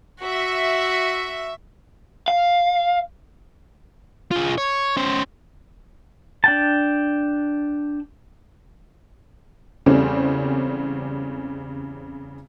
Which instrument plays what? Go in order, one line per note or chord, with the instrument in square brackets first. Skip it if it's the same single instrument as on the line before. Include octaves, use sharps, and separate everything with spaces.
[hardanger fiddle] F#4 [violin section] E5
[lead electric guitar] F5
F4 G#4
C#5
C#4 C5
[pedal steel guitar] D4 G5 A5
[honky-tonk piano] E2 C#3 G3 A3 C4 C#4